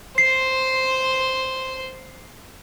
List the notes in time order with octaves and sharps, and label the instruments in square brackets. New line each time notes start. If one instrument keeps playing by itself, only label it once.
[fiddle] C5 C6 [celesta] C7